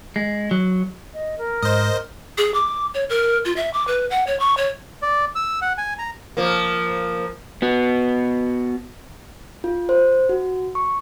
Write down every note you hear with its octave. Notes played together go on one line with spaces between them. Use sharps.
G#3
F#3
D#5
A#4
G#2 C5 D#5
G#4
D6
C#5
A#4
F4
E5
D6
B4
F#5
C#5
C#6
C#5
D5
E6
F#5
G#5
A#5
F3 A#3
B3 F#4
F4
C5
F#4
C#6